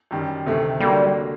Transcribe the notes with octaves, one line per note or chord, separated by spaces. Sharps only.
F#2 D#3 G3
D2 C3 D#3 A3
D3 F#3 G3 A#3